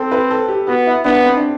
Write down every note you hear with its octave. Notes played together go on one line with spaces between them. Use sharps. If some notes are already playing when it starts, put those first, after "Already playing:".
Already playing: C4 A4
B4
A4
G4
B3 F#4
E4
B3 D4
C4
D4